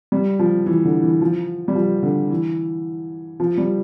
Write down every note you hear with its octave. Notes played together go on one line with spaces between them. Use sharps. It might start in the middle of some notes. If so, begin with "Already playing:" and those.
G3
F3
E3
D3
E3
F3
G3
F3
D3
E3
F3
G3